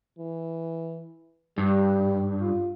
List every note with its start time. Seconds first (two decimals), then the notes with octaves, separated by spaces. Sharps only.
0.19 E3
1.58 G2 G3
2.40 F4